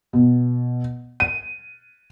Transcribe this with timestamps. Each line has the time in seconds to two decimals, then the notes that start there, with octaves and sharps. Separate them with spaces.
0.13 B2
1.20 D#7